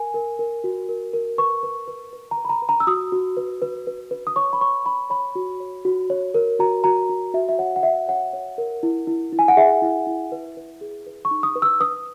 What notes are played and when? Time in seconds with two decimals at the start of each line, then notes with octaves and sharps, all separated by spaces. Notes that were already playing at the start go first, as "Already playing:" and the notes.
Already playing: A#4 G#5
0.14 A#4
0.39 A#4
0.64 F#4
0.89 A#4
1.13 A#4
1.38 B4 C#6
1.63 B4
1.88 B4
2.13 B4
2.31 A#5
2.38 B4
2.45 B5
2.49 A#5
2.62 B4
2.69 A#5
2.80 E6
2.87 F#4 D#6
3.12 F#4
3.37 B4
3.62 B4
3.87 B4
4.11 B4
4.27 D#6
4.36 C#5 C#6
4.53 B5
4.61 C#5 C#6
4.85 C#5 B5
5.10 C#5 B5
5.35 F#4
5.60 C#5
5.85 F#4
6.10 C#5
6.34 A#4
6.59 F#4 A#5
6.84 F#4 A#5
7.09 F#4
7.34 F#4 E5
7.49 E5
7.58 C#5 F#5
7.76 F#5
7.83 F#4 E5
8.08 C#5 F#5
8.33 C#5
8.58 A#4
8.83 E4
9.07 E4
9.32 E4
9.39 G#5
9.48 F#5
9.57 G#4 E5
9.82 E4
10.07 E4
10.32 B4
10.57 B4
10.81 G#4
11.06 B4
11.25 C#6
11.31 D#4
11.43 D#6
11.56 B4
11.62 E6
11.80 B4 D#6